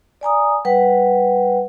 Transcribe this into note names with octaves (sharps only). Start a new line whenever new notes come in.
D5 G#5 A#5 D#6
G3 B4 F#5 G5